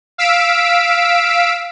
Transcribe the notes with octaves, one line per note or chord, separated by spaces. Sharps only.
F5 E6 B6 D7